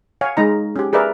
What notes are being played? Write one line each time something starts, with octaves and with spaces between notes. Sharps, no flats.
C#5 F5 G#5
G#3 D#4 A#5
C#4 G4
G#4 A#4 B4 D5 E5